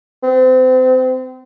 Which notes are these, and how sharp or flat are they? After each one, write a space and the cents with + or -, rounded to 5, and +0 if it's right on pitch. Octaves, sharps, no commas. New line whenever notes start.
C4 -30